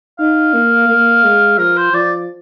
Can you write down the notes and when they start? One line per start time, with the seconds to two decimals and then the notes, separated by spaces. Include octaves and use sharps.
0.19 D#4 F5
0.54 A#3
0.89 A#3
1.24 G#3
1.58 F3 A#4
1.77 C5
1.93 F3 D5